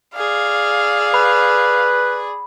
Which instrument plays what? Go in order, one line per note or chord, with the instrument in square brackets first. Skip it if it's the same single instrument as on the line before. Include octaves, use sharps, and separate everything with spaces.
[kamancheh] G#4 D5 [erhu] F5
[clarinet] B4 [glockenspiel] B5